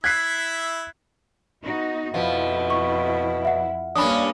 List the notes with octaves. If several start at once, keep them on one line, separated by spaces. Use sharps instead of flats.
E4 E5 F#6 G#6 B6 C7
B3 D#4 F#4
F2 B2 F3 E4
C#6
E5 F#5
G2 G3 A#3 C#4 D4 B5 D#6